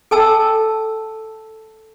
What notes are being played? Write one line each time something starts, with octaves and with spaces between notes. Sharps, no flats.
A4 G5 A5 E6